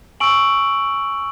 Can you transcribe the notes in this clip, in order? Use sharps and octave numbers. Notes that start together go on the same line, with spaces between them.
G#5 C#6 E6 D7 F#7